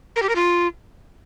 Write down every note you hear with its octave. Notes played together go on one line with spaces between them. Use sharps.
A#4
G4
A#4
F4